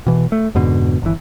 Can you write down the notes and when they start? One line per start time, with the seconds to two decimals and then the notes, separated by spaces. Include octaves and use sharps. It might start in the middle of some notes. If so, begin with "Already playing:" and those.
0.07 B2 E3
0.32 A3
0.55 F2 G#2 B2 D3
1.02 G1 E3